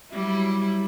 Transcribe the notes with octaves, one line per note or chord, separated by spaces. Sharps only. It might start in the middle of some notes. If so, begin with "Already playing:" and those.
F#3 G3 E4